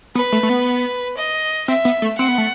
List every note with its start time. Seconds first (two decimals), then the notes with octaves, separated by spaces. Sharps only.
0.15 B3 B4
0.32 A3
0.43 A3
0.49 B3
1.17 D#5
1.68 C4 E5
1.85 B3
2.02 A3
2.18 C4 F#5
2.28 B3
2.38 A3